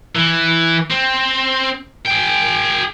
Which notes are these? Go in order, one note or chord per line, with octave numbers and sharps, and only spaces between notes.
E3
C4
G#4 G5